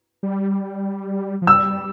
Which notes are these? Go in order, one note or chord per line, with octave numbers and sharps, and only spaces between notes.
G3
F3
G3 E6